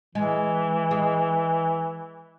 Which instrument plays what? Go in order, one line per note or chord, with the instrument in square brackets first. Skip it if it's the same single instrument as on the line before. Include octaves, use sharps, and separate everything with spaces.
[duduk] E3 [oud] G#3
[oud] G#3